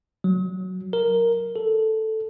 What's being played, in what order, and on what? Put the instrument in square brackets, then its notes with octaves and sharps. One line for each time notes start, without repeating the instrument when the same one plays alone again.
[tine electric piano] F#3
A#4
A4